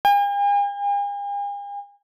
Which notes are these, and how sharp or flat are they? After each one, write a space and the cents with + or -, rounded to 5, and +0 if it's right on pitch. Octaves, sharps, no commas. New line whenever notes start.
G#5 -45